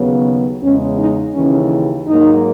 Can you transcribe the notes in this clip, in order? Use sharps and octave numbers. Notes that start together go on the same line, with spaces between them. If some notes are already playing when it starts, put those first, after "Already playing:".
Already playing: D#2 C#3 F#3 B3
E2 C#3 G#3 C#4
D#4
D#2 C#3 E3 C#4
G#2 F#3 A#3 D#4